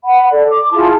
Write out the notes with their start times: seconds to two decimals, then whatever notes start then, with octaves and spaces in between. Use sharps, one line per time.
0.04 F#5 B5
0.30 A4 D5
0.47 D6
0.72 E4 F4 G#4 A5